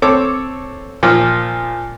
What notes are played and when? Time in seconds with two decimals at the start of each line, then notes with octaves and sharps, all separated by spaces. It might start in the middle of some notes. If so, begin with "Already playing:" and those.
0.02 C4 A4 C#5 D6
1.03 A#2 F3